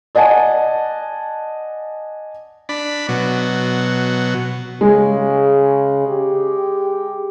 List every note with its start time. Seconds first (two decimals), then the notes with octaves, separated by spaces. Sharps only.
0.15 D5 D#5 F#5 G#5 A5
2.69 D4 B5
3.09 B2 F#3
4.81 C#3 G#3
6.08 G4